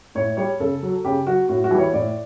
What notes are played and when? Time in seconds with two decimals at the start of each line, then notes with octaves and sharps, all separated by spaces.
0.15 A2 C#5
0.37 G3 C#5
0.60 C#3 A4
0.82 F#3
1.05 C#3 G4
1.26 F#3 F#4
1.49 A2 F#4
1.64 F#4
1.71 E3 G3
1.78 C#5
1.94 A2 D5